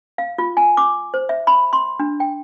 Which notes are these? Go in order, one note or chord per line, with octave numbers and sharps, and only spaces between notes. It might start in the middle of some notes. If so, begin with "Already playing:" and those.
F5
F4
G#5
D6
C5
E5
B5
C6
D4
G5